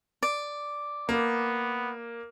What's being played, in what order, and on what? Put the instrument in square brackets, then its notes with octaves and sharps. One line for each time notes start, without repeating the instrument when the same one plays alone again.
[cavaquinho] D5
[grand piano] A#3 [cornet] B3